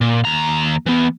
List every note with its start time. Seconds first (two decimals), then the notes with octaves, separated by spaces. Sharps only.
0.01 A#2
0.25 D#2 A#5
0.86 E3 B3